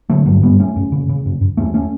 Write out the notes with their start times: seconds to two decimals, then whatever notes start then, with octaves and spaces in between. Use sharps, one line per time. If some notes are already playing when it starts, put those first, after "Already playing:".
0.09 D3 F#3 A3
0.26 G2 F#3 A3
0.43 G2 G3 B3
0.59 F#2 A3 C#4
0.76 F#2
0.92 C#3
1.09 C#3
1.26 F#2
1.41 F#2
1.57 E2 A3 C#4
1.74 A3 C#4